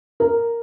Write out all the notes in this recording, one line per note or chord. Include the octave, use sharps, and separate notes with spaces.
A#4